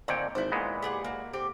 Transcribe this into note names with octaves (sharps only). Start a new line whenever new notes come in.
A#2 D3 D#3 C4 C#5 G5
G#1 E4 C5
A#2 G#3 B3
G4 G#4 F#5
A#3 F#4
D3 C4 G4